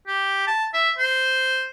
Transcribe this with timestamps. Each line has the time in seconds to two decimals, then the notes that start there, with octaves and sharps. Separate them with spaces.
0.07 G4
0.47 A5
0.74 E5
0.98 C5